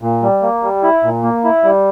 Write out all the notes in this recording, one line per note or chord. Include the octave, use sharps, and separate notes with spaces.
A#2
G3
A#3
G3
E4
A#2
A#3
E4
G3